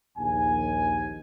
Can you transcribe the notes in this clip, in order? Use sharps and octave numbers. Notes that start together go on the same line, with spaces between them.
A#1 D#2 G#5